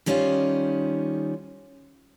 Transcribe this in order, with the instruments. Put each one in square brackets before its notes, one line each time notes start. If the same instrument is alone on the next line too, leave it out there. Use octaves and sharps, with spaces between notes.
[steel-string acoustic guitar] D#3 G3 C#4 D#4 F4 C5